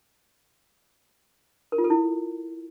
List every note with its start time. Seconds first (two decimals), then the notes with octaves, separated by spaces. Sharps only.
1.72 A#4
1.78 F4
1.84 A4
1.90 E4